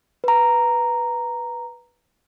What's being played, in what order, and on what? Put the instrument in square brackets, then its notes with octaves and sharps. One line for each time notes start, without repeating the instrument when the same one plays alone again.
[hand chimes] B4 A#5